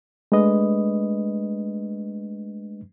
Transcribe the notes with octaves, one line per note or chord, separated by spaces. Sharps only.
G#3 A3 D4 B4 D#5